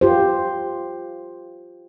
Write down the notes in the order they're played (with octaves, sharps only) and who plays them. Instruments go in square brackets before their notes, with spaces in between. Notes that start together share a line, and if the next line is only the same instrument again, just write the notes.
[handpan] F4 G4 C5